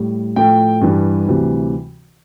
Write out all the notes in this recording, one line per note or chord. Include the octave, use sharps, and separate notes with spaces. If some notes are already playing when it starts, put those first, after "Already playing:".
Already playing: A2 G3
A2 F3 A3 G5
G2 E3 G3
D2 C3 E3 G3